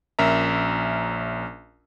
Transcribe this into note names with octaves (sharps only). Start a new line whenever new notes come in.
A#1 C#4 A#4 E5 A#5